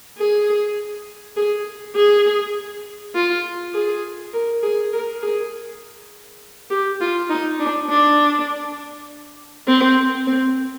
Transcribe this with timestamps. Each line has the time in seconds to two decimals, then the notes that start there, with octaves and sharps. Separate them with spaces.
0.18 G#4
1.37 G#4
1.95 G#4
3.15 F4
3.74 G#4
4.33 A#4
4.63 G#4
4.93 A#4
5.22 G#4
6.70 G4
7.01 F4
7.30 D#4
7.60 D4
7.90 D4
9.67 C4
10.27 C4